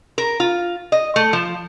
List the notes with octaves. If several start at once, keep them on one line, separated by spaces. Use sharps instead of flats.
A#4
F4
D#5
A3
F3